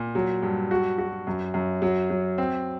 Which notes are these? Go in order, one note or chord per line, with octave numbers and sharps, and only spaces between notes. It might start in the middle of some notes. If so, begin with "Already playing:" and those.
Already playing: A#2
F#3
G2
F#4
F#4
F#2
F#2
F#3
F#3
C4